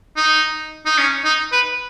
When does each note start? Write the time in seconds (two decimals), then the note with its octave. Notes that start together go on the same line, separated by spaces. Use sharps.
0.17 D#4
0.86 D#4
0.98 C#4
1.25 D#4
1.52 B4